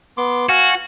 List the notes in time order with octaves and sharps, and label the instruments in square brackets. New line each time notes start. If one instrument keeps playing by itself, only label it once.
[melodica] B3 C6 D6
[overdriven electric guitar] F#4 [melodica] F5 G#5